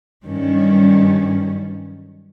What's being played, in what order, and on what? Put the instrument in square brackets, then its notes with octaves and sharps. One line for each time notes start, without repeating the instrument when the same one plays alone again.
[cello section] G2 D#3 F#3 G3 C#4